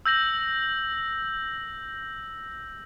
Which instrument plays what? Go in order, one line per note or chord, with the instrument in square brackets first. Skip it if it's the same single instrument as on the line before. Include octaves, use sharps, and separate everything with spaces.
[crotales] E6 G6 A#6 F#7